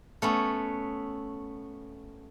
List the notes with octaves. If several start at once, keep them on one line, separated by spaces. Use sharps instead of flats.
A3 B3 C#4